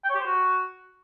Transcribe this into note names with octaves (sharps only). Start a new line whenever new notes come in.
G5
C#5
G4
C5
F#4